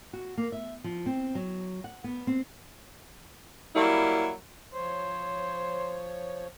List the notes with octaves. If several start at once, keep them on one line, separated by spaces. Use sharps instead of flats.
F#4
A#3
E5
F3
C4
F#3
F#5
B3
C4
F#3 G3 A#3 E4
F3 C5 C#5